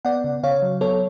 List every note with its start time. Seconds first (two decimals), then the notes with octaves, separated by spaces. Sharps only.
0.05 B3 D5 F#5
0.24 C#3
0.43 C#3 C#5 F5
0.62 F#3
0.81 B3 A4 C#5